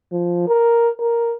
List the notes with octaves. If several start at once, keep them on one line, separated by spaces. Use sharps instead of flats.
F3
A#4
A#4